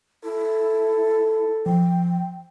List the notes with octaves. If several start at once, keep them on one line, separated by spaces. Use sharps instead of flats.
E4 A4
F3 G5